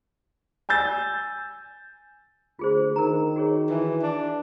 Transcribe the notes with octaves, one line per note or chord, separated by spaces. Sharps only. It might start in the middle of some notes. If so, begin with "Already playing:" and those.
G#5 E6 G6 A6
D2 F4 G#4 C5
D#3 A#4 A#5
F#4 G#4 C#5
E3
D4